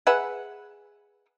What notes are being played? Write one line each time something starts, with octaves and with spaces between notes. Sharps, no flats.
G#4 B4 E5 F#5